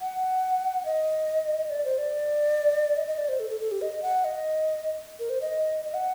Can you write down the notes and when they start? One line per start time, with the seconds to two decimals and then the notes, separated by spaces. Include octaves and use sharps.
0.01 F#5
0.85 D#5
1.70 D5
1.85 C5
1.98 D5
2.97 D#5
3.07 D#5
3.18 D5
3.28 C5
3.40 A4
3.50 A4
3.61 A4
3.71 G4
3.81 D#5
4.03 F#5
4.25 D#5
5.19 A#4
5.30 C5
5.41 D#5
5.85 D#5
5.94 F#5